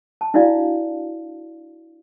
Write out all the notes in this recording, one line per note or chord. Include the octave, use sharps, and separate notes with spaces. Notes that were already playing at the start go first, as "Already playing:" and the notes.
A5
D4 E4 F#4 D5 F5